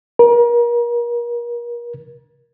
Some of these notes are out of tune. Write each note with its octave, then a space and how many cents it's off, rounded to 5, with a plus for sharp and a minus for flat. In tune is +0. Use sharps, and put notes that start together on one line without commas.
A#4 +35